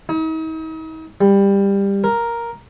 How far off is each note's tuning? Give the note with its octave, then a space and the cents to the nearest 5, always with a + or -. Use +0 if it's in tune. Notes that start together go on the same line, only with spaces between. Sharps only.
D#4 +45
G3 +15
A#4 +5